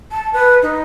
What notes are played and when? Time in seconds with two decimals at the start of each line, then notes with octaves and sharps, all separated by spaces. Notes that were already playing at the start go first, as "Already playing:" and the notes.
0.12 A5
0.33 B4
0.62 D#4